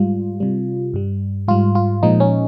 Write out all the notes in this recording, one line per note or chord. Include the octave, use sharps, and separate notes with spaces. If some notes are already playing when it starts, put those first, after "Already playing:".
Already playing: G#2 G3 F4
C3 G3
G2 G3
G#2 G3 F4
F4
A#2 F3 G#3 D#4
C#4